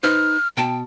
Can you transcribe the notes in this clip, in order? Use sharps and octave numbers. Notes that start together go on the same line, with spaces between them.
D#4 B4 C5 F6
B2 G5 A5